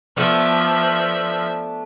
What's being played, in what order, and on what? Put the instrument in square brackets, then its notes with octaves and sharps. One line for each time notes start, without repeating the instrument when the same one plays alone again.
[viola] F3 E5 [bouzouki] A3 B3 D4